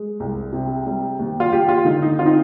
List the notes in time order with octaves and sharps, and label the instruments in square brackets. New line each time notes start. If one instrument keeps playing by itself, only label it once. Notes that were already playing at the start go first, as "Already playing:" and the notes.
Already playing: [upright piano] G#3
C2
C3
G3
D#2
F4
D#2 G4
F4
D3 D#4
D#4
C4 F4
D#4